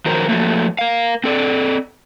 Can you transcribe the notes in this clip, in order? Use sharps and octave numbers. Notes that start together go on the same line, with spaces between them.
D#3 F3 F#3 A#4 C5
F3 F#3 A3 A#3
A#4 F5
C4 A4 D5